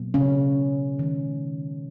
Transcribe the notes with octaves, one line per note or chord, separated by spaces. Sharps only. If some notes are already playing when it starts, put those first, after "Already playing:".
Already playing: B2 F#3 A#3
C#3 C#4
D#3 G#3